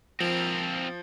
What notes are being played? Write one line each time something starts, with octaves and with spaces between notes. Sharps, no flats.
F3 C4 A#4